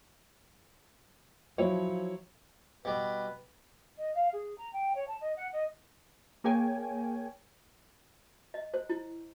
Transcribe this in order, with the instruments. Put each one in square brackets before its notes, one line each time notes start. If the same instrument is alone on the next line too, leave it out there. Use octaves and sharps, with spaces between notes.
[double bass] F3 [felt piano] F#3 E4 C#5
[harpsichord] B2 G3 [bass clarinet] B4
[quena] D#5
F5
G#4
A#5
G5
C#5
A5
D#5
F#5
D#5
[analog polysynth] A#3 G#4 A#4 C#5 G5 G#5
[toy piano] D#5
C5
E4